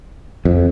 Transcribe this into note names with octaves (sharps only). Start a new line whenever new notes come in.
F2